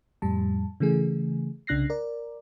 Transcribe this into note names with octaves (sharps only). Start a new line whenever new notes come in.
F2 A2 G3 A5
C#3 E3 A3 G#4
C2 C#3 D4 F#6 A#6 C7
A#4 D5